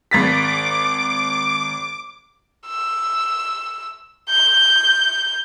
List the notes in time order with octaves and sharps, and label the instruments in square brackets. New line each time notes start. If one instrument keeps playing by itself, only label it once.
[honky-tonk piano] G#1 A6 B6 [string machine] D6
[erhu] E6
G6